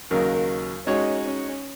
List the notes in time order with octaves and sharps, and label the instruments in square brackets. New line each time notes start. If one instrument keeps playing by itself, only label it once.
[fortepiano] D#2 C#3 F#3 [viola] A#4
[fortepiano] G#3 D#4 F#4 C#5 [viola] C#4
[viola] C#4